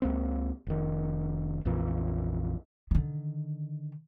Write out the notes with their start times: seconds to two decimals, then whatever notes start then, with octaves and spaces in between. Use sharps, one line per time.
0.02 C#2 A#3 C4
0.67 F1 D#3
1.65 A#1 F2 A#2 E3
2.91 D3 D#3